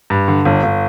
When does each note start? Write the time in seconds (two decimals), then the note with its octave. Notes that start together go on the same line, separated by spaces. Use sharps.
0.10 G2
0.28 D3
0.45 G1
0.63 G1